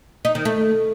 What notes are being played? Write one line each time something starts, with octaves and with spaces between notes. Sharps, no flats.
D#4
D#3
A3